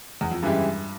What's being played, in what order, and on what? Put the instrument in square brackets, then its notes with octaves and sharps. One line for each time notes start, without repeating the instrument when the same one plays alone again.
[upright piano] E2
F2
[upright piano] G2 [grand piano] C#3 E3 G#3 E4 G4